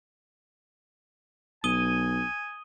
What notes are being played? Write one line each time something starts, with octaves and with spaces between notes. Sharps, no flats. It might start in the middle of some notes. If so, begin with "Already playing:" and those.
B1 G#5 D#6 D#7 G7